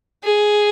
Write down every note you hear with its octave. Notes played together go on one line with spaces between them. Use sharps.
G#4